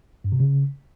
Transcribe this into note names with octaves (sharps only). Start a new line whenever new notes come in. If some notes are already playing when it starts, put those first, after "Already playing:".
G2
C3
C#3